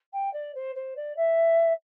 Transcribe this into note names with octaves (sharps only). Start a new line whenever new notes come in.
G5
D5
C5
C5
D5
E5